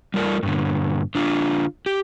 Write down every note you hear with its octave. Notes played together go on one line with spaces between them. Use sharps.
G3 A3 F4 A#4 D5
G2 A#2 D3
D3 D4 F4
G4